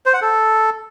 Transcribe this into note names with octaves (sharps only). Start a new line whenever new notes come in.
C5
F#5
A4